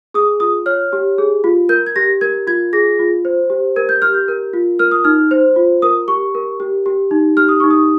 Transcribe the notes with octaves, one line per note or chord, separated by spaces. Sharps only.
G#4 D#6
F4 D#6
C#5 F6
G4
G#4
F4
A#4 G6
G#6
G4 A#6
A#4 G#6
F4 G#6
G#4 A#6
F4
C5
G4
A#4 G#6
G6
G4 F6
G6
A#4
F4
A#4 F6
D#6
D#4 F6
C5
F4
A#4 D#6
G4 C#6
A#4
G4
G4
D#4
G4 F6
D#6
D#4 C#6
D#6